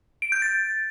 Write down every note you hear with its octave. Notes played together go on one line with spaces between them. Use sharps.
D7
G6
A6